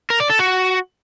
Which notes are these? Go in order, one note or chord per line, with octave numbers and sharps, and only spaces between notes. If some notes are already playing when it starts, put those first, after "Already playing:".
A#4
D5
A4
F#4